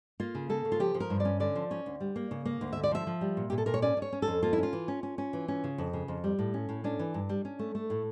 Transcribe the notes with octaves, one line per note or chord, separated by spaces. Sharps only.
A#3 F4
C#3
A#3 A4
C#3
F4
F3 G4
F3
A#4
G2
D5
C#4
D3 D5
F3
C#4
D2
G3
A#3
C#3
A#3
D2
D3 E5
D5
F3 E5
F3
G3
A#2
A#2 G4
A4
A#2 A#4
C#5
C#4 D5
C#4
C#5
C#4
A4
F2
A#3 F4
E4
C#4
F4
E3
C#4
C#4
C#4
E3
C#4
C#3
F2
C#3
F2
G3
A2
C#4
A2
C#4 D4
E3
G2
G3
C#4
A3
A3
A2